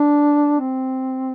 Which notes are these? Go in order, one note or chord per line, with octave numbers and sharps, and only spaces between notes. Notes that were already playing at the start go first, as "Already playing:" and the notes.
Already playing: D4
C4